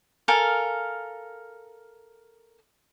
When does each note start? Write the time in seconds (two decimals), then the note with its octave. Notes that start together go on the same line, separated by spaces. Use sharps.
0.28 A4 A#4 F5 G#5